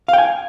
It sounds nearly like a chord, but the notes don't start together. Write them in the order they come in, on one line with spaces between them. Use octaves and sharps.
F5 G5 G#5